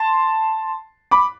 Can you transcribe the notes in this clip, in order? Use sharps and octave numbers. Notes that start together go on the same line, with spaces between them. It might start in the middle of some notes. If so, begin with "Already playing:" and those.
Already playing: A5 C6
B5 D6